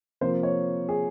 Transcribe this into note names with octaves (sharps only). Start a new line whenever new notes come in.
C3 F3 A#3 C5
C#5
G#4